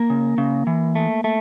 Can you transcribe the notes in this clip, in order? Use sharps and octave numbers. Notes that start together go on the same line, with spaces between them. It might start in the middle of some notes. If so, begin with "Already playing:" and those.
Already playing: A#3 A#4
C#3
C#3
E3
A3
A3